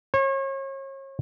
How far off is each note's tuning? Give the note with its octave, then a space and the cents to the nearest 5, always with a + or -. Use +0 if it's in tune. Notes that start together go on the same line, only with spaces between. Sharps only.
C#5 -35